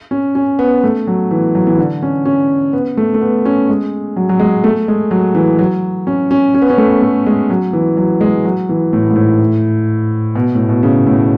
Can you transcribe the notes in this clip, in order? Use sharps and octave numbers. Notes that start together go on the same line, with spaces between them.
C#4
C#4
B3
A3
F#3
E3
F#3
E3
D3
C#4
C#4
B3
A3
A3
B3
C#4
G#3
F#3
F#3
G#3
A3
G#3
F#3
E3
F#3
C#4
C#4
C#4
B3
C#4
A3
A3
G#3
F#3
E3
F#3
G#3
F#3
E3
A2
G#2
A2
B2
A2
B2
C#3
A2